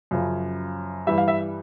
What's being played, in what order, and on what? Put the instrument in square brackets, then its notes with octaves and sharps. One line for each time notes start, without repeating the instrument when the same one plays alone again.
[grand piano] F#2 C#3 F3
G2 E3 G3 E5
F5
E5